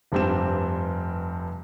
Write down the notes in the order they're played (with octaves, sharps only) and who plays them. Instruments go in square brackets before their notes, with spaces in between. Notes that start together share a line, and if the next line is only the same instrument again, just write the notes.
[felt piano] F1 G2 C4 G4 E7